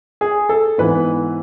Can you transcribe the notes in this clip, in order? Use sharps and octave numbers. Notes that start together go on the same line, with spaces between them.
G#4
A4
G#2 E3 B3 B4